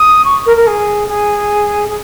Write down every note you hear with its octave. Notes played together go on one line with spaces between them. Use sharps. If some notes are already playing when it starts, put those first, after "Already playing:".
Already playing: D#6
C#6
A#4
A#4
G#4
G#4
G#4